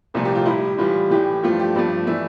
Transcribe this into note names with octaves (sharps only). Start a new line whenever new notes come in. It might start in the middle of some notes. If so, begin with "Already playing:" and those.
C2 A#2 F3 A3 A4
G4
F4
A2 G3 E4
A2 E3 G3 F4
A2 E3 A3 G4
G2 F3 A3 F4
G4
G2 F3 A3 D5
E3 A3 E5